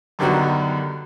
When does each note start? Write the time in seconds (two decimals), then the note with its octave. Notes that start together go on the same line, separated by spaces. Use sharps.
0.19 F#2 D3 D#3 G3 B3 F#4